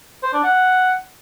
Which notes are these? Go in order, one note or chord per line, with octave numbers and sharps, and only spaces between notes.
C5
D4
F#5